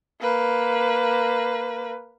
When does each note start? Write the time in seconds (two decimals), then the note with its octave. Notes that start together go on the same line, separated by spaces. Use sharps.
0.21 A#3 B4